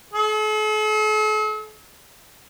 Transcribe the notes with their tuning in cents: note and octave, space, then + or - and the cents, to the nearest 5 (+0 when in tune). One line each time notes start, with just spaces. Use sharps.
A4 -45